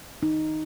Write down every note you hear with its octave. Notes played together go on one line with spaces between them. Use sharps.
D#4